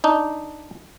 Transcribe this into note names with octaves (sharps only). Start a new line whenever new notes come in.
D4 D#4